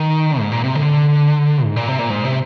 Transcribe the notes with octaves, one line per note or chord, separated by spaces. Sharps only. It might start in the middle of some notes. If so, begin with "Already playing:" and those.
Already playing: D#3
G#2
A#2
C3
D3
G#2
A#2
C3
A#2
G#2
C3